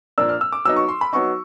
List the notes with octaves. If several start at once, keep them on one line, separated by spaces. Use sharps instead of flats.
A#2 F3 A#3 D4 E6
F6
E6
D6
F#3 B3 D#4 E6
C#6
C6
B5
F#3 B3 D#4 C#6